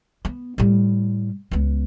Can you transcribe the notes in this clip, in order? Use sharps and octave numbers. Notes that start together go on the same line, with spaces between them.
B3
A2 G3
C#2 B3